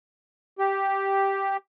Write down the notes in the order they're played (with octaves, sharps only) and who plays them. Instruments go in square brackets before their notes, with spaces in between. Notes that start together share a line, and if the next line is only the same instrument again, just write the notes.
[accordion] G4